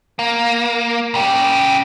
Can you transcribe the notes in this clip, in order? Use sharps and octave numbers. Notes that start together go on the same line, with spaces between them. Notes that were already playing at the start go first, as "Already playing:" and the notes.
A#3
C#3 G4